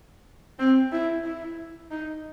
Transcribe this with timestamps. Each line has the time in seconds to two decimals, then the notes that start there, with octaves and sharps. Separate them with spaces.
0.59 C4
0.92 E4
1.24 E4
1.90 D#4